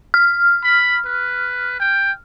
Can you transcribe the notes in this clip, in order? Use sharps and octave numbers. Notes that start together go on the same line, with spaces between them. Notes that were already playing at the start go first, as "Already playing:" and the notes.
F6
B5
B4
G5